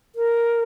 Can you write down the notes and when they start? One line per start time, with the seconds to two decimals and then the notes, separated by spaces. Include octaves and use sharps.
0.15 A#4